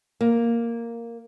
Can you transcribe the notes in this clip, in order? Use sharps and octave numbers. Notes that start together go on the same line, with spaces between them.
A#3